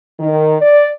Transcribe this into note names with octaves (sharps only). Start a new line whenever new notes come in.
D#3
D5